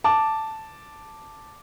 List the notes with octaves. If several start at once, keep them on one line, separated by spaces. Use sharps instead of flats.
A5 D6